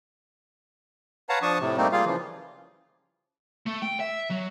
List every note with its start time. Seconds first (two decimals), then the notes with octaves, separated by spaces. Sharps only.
1.29 B4 C#5 F5 F#5 A5 A#5
1.42 F3 D4 A5 C#6 D#6
1.60 A2 C3
1.77 G3 A3 A#3 C4 D#4
1.92 G3 A#3 F4 G#4 F5
2.06 C#3 E3 F3
3.66 A3
3.82 G5
4.00 E5
4.30 F#3